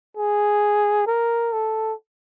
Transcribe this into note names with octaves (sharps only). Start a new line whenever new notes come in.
G#4
A#4
A4